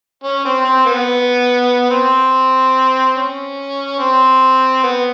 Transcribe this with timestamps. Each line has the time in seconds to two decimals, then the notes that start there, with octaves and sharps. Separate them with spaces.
0.24 C#4
0.45 C4
0.65 C4
0.86 B3
1.91 C4
3.16 C#4
3.99 C4
4.83 B3